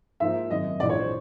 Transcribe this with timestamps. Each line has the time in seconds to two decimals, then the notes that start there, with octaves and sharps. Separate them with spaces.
0.20 G#2 F3 A#3 D#4 E5
0.50 G#1 F#2 D#3 D#5
0.79 A#1 G#2 E3 G#3 D5
0.89 C#5
0.99 C5